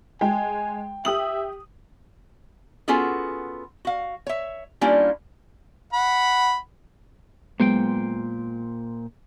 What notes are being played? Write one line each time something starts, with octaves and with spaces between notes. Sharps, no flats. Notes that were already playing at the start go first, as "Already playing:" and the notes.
G#3 G5 G#5
G4 E5 D#6 F#7
B3 C#4 F4 F#4 G#4 A4
F#4 F5
C#5 E5
G3 A#3 C#4 D4 E4 F4
F#5 B5
A#2 F#3 G#3 B3 C5 G5